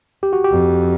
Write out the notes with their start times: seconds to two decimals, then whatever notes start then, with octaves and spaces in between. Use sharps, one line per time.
0.23 G4
0.33 F#4
0.44 G4
0.51 F2